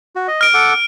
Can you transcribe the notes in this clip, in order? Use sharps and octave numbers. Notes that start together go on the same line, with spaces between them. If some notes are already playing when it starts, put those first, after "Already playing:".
F#4
D#5
F6 D7
A4 F#5 D6